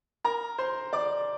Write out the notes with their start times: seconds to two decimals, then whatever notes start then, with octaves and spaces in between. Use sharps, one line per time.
0.24 A#4 A#5
0.58 C5 C6
0.93 D5 D6